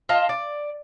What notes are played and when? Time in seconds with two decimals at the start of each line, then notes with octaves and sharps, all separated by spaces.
0.09 F4 D#5 A5
0.29 D5